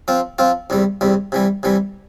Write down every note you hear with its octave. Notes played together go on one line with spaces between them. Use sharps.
F3 C4 F4
F3 C4 F4
E2 C3 G3
E2 C3 G3
C3 E3 G3
C3 E3 G3